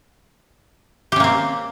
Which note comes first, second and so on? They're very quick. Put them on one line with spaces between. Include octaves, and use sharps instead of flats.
G4 C#4 A#3 C4